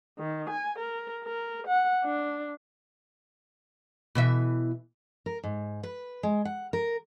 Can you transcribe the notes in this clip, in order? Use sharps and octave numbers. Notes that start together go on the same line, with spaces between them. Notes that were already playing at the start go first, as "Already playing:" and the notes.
D#3
G#5
A#4
A#4
F#5
D4
B2 E3 E5
A#4
G#2
B4
G#3
F#5
A#4